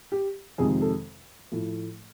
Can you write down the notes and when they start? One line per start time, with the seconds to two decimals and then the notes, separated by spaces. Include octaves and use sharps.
0.12 G4
0.58 F2 C3 D#3 G#3 G#4
0.82 A4
1.52 A2 F3 A3